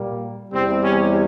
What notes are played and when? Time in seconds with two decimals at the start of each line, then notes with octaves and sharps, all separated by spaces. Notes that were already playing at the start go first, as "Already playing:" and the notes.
Already playing: A#2 G3 A#3
0.52 E2 C3 G3 C4
0.83 C#4